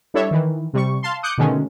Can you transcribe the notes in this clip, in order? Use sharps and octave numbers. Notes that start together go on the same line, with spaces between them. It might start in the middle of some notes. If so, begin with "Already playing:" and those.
G3 D4 E4 A4 C#5 E5
D#3 E3
C3 G3 C#6
F5 A5 C6
D6 D#6 F#6 G6 C#7
B2 D3 D#3 G#3 A3 C#4